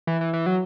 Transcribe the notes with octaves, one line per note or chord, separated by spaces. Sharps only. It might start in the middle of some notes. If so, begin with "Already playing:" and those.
E3
E3
E3
F#3